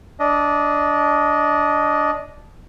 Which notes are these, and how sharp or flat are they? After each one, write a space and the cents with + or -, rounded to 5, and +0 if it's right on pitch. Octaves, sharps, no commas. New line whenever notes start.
D4 -15 D#5 +0